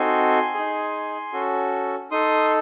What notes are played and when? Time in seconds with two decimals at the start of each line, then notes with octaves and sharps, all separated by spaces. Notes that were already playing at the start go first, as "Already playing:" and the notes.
Already playing: C4 D#4 F#4 A4 G#5 C6
0.55 D#4 G#4
1.33 C#4 F#4 A4
2.11 D#4 A4 C6 D#6